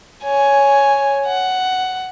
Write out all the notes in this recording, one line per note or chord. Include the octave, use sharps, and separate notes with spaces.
C#5 G#5
F#5